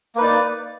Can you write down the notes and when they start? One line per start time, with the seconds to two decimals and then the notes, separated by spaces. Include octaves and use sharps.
0.15 A#3
0.18 B4
0.21 D#4
0.23 D5